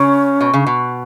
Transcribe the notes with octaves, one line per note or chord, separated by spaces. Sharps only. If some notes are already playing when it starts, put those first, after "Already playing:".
Already playing: C#3 C#4
B2
C#3
B2